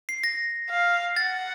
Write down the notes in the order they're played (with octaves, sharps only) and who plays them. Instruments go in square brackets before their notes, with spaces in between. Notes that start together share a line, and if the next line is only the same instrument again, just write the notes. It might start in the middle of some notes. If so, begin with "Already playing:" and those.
[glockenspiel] C7
A#6
[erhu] F5
[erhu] F#5 [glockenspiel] A6